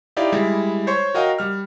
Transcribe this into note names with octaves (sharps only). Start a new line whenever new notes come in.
D#4 E4 G4 D5 F5
G3 G#3 E4
C5 C#5 C6 C#6
F#4 A#4 D#5 F5 G5
G3 F6